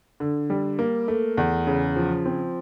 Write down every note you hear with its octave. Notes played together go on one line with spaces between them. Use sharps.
D3
G3
A#3
A3
E2
C#3
F3
C4